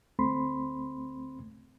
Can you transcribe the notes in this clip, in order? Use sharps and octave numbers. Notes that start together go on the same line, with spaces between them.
D2 A3 C4 B5 C6